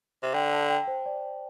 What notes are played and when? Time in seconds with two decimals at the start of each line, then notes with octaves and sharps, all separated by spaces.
0.23 C3
0.34 D3 G5
0.52 A5
0.69 G5
0.87 C5
1.06 D5